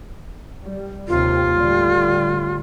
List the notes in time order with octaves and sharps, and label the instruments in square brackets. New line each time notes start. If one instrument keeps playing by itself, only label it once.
[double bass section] G3
[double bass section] D#2 C3 [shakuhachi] F4
[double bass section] A2 D3 G3